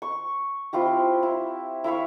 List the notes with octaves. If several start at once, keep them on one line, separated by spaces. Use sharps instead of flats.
C#6
C4 E4 F4 G4
E4
E4 E5 F5 C#6